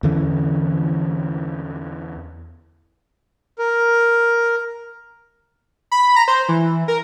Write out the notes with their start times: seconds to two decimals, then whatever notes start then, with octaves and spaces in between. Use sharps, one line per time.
0.03 E2 D3 E3 C#4
3.59 A#4
5.92 B5
6.16 A#5
6.28 C5
6.49 E3
6.88 A#4